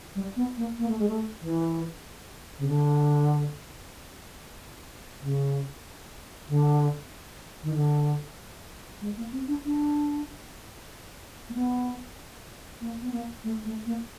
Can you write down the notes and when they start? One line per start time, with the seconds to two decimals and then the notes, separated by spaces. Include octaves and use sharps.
0.15 G3
0.36 B3
0.57 A#3
0.78 A#3
0.88 A3
0.99 G#3
1.08 A3
1.41 E3
2.59 C#3
2.68 D3
5.21 C#3
6.48 D3
7.63 D#3
7.74 D3
9.01 G#3
9.17 A#3
9.32 C4
9.48 D4
9.65 D4
11.49 A#3
11.54 B3
12.81 A#3
13.01 B3
13.12 A#3
13.44 A3
13.65 A3
13.86 A#3